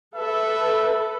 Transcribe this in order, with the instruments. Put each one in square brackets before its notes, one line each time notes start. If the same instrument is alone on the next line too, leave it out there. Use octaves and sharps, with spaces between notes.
[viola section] A4 B4 [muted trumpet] E5